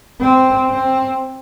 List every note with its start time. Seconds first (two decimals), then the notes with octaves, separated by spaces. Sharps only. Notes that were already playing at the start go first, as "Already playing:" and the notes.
0.21 C4
0.70 C4